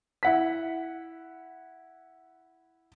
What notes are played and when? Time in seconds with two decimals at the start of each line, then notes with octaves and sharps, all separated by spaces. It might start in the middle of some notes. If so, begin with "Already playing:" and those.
0.23 E4 F#5 B6